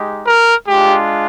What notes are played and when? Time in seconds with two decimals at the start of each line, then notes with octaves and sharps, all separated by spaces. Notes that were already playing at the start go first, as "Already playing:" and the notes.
Already playing: G#3 D#4 G4
0.26 A#4
0.67 G#3 D4 F4 G4